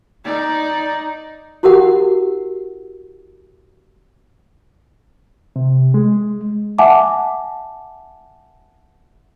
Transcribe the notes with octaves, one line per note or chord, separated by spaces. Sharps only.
D#4 D5
E4 F#4 G4 A#4 F#5
C3
G#3
E5 F#5 G#5 A5 D6